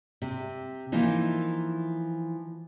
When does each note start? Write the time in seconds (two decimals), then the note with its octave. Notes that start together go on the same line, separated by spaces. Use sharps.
0.22 C3
0.92 E3 F3 A#3 D#4